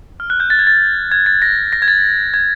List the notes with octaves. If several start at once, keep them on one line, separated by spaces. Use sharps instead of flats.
F6
F#6
G6
A6
G#6
A6
G#6
A6
A#6
A#6
G#6
A6
G#6